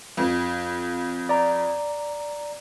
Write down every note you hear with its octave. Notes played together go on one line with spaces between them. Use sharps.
F2
D5 A#5